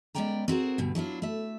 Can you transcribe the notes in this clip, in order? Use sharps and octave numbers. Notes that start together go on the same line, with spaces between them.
G#3 B3 C#4 D5 G5 A#5
C4 F#4 G#4 A#4
D2 G2 B2
F#3 D4 E4 F4
A3 E5